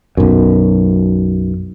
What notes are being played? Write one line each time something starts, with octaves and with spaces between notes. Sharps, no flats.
B1 F#2